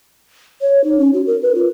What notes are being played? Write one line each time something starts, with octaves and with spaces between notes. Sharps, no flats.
C#5
D#4
C#4
F#4
A#4
B4
F4